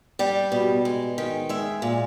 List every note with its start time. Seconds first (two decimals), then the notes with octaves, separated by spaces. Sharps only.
0.19 G3 G4
0.52 B2
0.85 G#3
1.18 D#3
1.49 G#3 E5
1.82 A#2